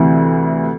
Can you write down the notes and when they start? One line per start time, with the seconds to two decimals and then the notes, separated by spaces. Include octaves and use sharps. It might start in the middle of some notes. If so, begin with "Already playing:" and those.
Already playing: D2 C3 E3